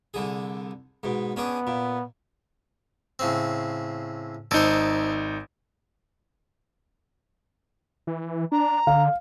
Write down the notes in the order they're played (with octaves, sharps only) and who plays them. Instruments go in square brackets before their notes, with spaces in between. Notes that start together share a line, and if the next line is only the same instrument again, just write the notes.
[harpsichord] C2 D3 G#4
G#2 B2
[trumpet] B3 [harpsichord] C#4 D4 G#4
[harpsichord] A#2
A2 C#3 C4
[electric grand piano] G#1 D#4 [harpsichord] A4 C5
[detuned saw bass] E3
[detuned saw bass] D4 [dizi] A#5
[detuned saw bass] D3 [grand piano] F5